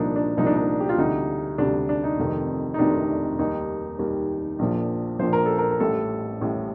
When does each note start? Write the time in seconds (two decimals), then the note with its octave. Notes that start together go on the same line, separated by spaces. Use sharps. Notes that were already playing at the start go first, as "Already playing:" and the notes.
Already playing: C2 A#2 F3 D4 D#4
0.16 D4
0.37 C2 A#2 F3 D#4
0.46 D4
0.56 D#4
0.80 G4
0.89 F4
0.98 D2 C3 G3 D#4
1.58 D2 C3 G3 D4
1.89 D4
2.04 D#4
2.18 F1 F2 C3 D#3
2.74 D#4
2.78 F1 F2 C3 D#3 D4
3.39 D#2 D#3 G3 D#4
3.99 D#2 D#3 G3
4.59 A#1 A#2 F3
5.19 A#1 A#2 F3 C5
5.33 A#4
5.46 A4
5.58 A#4
5.71 A#4
5.80 A1 A2 G3 A4
6.40 A1 A2 G3